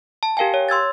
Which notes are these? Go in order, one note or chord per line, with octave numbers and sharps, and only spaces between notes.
A5
G4 A#4 F5 G5 G#5
C#5
C6 E6 G#6 A6